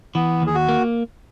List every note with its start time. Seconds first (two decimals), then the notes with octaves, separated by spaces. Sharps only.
0.15 E3 B3
0.42 D#2 G#4
0.55 F#4
0.69 A#3